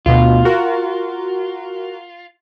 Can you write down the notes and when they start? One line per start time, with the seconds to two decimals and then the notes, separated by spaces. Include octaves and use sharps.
0.06 D2 B2 F4
0.45 F#4 A#4